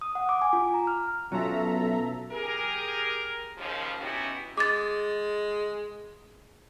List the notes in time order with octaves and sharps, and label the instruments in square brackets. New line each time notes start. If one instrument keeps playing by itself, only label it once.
[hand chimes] D#6
F#5
D6
G#5
F4
A#5
F6
[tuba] B1 [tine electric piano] B2 C#4 F4 [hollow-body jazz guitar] F#3 [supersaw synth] A4 E5 A#5
[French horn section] G4 G#4 A#4
D#2 C#3 F3
B3 C#4 D#4 E4 F#4 G4
[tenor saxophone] G#3 [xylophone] D6 A6